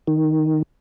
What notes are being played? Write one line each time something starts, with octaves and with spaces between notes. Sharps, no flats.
D#3